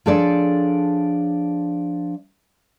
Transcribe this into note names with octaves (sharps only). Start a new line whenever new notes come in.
F3 D4 G#4 A4 C#5 D5